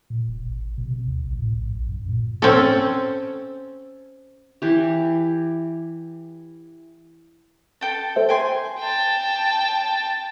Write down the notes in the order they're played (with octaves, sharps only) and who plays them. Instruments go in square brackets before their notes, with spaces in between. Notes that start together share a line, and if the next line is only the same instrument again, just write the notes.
[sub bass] A#2
D1
G#1
B2
C3
D2
A#1
A2
A#1
A#1
F#2
A#2
[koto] C4 C#4 A4
[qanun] E3 G4
[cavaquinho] A4 G5 A5
[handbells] A4 C5 E5
[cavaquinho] G5 G#5 C6
[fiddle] G5 A5